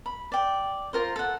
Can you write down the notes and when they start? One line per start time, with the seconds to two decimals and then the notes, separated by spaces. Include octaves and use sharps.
0.06 B5
0.32 D5 G5
0.93 F4 A#4 C5
1.16 A4 F#5